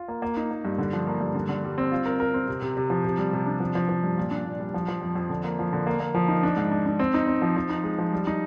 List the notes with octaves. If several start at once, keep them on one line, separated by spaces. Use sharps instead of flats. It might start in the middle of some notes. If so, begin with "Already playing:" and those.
Already playing: F4
A#3
A#3
D#4
A#3
G2
D3
F3
A#3
G2
D3
D3
G3
C4
F4
A#4
A#4
C4
C3
C3
C3
F3
C3
G3
C3
D4
F3
F3
F3
G2
A#2
D4
A#2
G3
F3
F3
F2
F2
D3
A#3
F3
D3
A#3
A#3
F3
D#4
D4
G#2
D4
D4
C4
D#4
C4
F3
F3
D#4
G#3
F3
G3
D#4